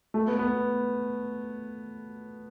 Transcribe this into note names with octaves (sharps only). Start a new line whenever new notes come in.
A3
B3
B3